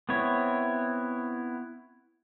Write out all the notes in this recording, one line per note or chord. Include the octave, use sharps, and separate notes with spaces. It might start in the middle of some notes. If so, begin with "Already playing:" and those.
B3 C4 E4 C#5